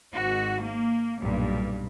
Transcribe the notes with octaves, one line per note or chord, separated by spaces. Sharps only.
G#1 G#2 F#4
A#3
B1 G2 A#2